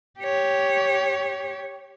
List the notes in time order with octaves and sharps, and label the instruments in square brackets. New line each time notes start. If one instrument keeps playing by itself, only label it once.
[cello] G4 C#5